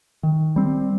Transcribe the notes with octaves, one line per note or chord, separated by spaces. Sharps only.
D#3
G3 C4